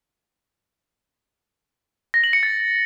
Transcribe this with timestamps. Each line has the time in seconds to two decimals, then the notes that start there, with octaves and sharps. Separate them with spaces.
2.14 A#6
2.24 F#7
2.33 C#7
2.43 A6